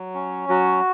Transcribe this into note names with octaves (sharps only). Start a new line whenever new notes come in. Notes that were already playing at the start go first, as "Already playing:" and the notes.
Already playing: F#3
C#4
F#3 F#4